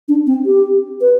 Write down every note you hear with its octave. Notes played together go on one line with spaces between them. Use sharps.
D4
C4
G4
B4